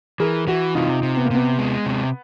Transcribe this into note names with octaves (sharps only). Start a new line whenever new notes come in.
E3 G#4 A#4
E3 E4 F#4
C3 D#4 F4
C3
B3
A#3
C3 B3
G#3
C3